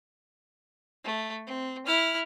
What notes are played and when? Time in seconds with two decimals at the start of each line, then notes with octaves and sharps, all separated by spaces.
1.04 A3
1.47 C4
1.86 E4 F6